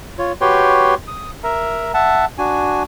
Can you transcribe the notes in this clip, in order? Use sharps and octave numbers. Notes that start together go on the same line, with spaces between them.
F4 C#5
F#4 G4 B4 C#5 G5 C6
D#6
A#4 E5 A#5
E5 F#5 A5
D4 F#4 G#5